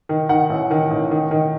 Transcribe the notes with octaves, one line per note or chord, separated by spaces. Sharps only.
D#3
D#3 F#5
A1
D#3
A1
D#3
D#3